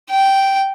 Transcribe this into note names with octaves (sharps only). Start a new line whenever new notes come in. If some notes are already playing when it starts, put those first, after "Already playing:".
G5